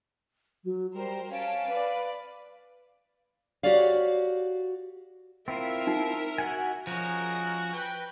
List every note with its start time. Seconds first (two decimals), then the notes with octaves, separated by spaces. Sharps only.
0.64 F#3
0.94 G3 A#4 C5
1.30 C#4 F5 A5 D7
1.68 B4 D5
3.63 F#4 G4 C#5 D5 F5
5.48 C4 E4 F4 A#4 E5
5.87 D#4
6.38 F#4 F#5 G#5
6.87 F3 G#3 C#4 F#4 G#4 A#4
7.72 B4 G5